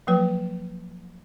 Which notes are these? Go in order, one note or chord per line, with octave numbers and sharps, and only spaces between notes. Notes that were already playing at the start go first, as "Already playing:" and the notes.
F3 F#3 A#3 B4